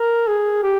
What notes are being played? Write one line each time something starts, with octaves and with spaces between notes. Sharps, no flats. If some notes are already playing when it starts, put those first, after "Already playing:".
Already playing: A#4
G#4
G4